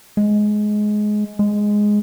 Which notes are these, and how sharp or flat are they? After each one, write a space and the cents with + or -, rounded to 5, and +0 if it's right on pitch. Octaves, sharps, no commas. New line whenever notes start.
G#3 +15
G#3 +0